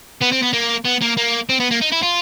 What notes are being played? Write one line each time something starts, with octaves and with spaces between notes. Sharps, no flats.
B3
C4
B3
A#3
B3
A#3
A#3
C4
B3
A#3
D#4
E4
F4